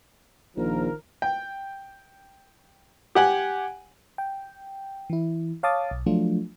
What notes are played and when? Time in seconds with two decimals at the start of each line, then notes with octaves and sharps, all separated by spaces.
0.57 A#1 D#3 F3 A#4
1.22 G5
3.15 G4 F#5 G#5
4.18 G5
5.10 E3 E4
5.63 C#5 F5 A5 D6 D#6 A6
5.91 B1
6.06 F3 F#3 A3 D4 F4